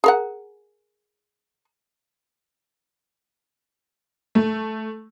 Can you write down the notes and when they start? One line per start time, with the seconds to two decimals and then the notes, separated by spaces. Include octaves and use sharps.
0.04 G#4 A#4 F#5
4.35 A3